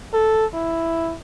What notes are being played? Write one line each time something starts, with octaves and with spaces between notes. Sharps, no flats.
A4
E4